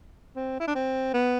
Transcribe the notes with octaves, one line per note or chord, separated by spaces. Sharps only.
C4
E4
D4
C4
B3